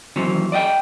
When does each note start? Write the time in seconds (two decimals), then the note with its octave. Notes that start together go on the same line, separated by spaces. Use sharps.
0.16 D#2 E3 F#3 C4 C#4
0.52 D5 D#5 F#5 G5